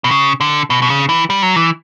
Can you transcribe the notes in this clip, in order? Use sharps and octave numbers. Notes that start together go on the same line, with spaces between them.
B2
C#3
D3
B2
B2
C#3
E3
G3
F#3
E3